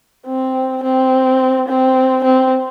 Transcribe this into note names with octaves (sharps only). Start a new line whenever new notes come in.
C4
C4
C4
C4